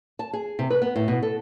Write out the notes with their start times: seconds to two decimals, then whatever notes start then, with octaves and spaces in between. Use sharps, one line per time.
0.19 A5
0.33 G#4
0.59 C3
0.70 B4
0.82 B3
0.96 A2
1.08 B2
1.23 A4